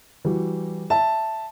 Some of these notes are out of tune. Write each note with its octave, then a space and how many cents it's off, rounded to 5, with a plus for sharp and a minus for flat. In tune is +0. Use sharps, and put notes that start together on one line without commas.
E3 +10 G3 -10 F#4 -10
E5 +0 A5 +0